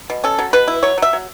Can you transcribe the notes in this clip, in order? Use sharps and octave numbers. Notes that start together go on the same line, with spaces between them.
B2
C#4 A4
F#3
B2 B4
E4
F#3 C#5
F#3 E5
F#3